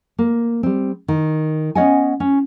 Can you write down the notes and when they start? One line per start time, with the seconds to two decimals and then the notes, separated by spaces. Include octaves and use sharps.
0.18 A#3
0.63 G3 C4
1.08 D#3
1.75 B3 C#4 C#5 D#5 F#5 G#5
2.20 C#4